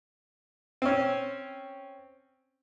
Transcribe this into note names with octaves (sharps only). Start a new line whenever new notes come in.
C4 C#4